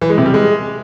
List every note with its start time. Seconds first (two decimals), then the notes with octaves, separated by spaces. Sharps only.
0.01 E3
0.10 G#3
0.18 C3
0.26 G3
0.34 G#3